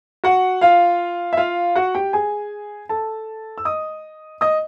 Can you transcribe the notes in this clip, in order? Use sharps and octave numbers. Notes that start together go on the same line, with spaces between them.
F#4 F#5
F4 F5
E5
F4 F5
F#4 F#5
G4 G5
G#4 G#5
A4 A5
E6
D#5 D#6
D#5 D#6